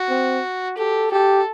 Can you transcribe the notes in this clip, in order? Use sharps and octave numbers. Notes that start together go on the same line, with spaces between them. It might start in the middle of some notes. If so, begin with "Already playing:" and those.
Already playing: F#4
C4
G4 A4
G4 A4